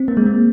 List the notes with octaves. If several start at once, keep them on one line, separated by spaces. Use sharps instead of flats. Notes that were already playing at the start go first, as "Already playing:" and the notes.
Already playing: C4
A#3
G#3
A#3